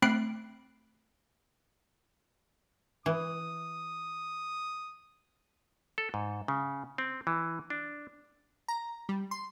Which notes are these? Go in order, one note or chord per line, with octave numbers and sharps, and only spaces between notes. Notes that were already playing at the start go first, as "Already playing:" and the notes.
A3 C4 B5 F#6 C7 D7
E3 D#6
A4
G#2
C#3
C4
E3
D4
A#5
G3
C6